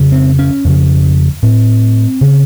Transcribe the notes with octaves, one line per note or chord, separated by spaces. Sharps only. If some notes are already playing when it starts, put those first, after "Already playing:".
Already playing: F2 C#3
C4
C#4
F2 C#3
A2 C4
C#3